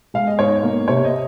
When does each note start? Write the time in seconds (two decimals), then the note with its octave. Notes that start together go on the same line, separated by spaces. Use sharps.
0.14 G#3 F5
0.27 D#5
0.39 G#2 C#5
0.63 A#3
0.88 C3 C#5
1.04 D#5